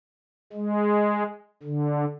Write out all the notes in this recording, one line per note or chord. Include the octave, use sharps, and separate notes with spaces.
G#3
D3